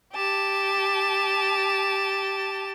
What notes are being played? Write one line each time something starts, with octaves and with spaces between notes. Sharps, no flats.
G4 A5